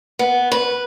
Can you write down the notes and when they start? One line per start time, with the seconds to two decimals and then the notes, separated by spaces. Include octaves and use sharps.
0.19 B3
0.52 B4